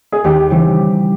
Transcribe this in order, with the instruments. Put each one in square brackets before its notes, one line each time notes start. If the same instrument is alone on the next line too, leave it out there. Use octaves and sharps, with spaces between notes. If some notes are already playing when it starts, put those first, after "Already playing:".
[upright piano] G#4
[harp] D#2 [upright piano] G4
[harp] C#3 E3 G3 C4